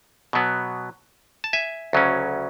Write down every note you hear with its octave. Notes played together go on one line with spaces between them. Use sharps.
B2 F#3 B3
A5
E5 G#5
D2 C#3 F#3 C#4